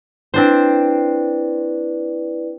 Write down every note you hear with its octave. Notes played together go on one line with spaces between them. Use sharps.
C4 D4 E4 B4 C5 D5